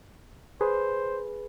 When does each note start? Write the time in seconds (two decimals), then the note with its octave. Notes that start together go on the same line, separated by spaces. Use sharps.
0.61 G#4 B4 C5